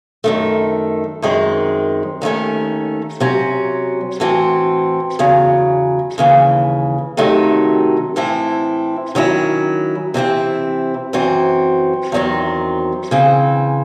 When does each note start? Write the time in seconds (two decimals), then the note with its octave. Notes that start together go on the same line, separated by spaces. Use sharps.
0.24 F#2 D#3 A3
1.22 F#2 D#3 G#3 C4
2.22 D#2 D#3 A3 C#4
3.20 C3 F#3 C#4
4.20 A2 E3 C4 F#4
5.19 E2 C#3 F#3
6.18 D#2 C#3 E3
7.17 C3 D#3 F#3 A3 D#4
8.16 A2 E3 C4 E4
9.15 D#3 F#3 C#4 E4
10.14 C3 E3 C4 E4
11.13 F#2 E3 C4 F#4
12.12 E2 D#3 F#3 C4
13.11 C#3 E3 C4